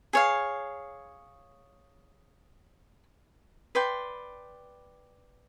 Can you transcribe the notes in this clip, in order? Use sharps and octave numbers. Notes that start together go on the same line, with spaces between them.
G#4 C#5 F5
B4 D5 G5 C6